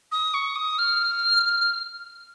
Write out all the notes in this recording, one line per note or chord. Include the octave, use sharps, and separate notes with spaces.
D#6
C#6
D#6
F6